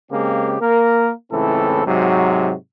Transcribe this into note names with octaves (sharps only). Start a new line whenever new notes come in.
C#3 G#3 A#3 C4 G4
A#3 A#4
C#2 A2 E3 C4 A4
G#2 C3 F#3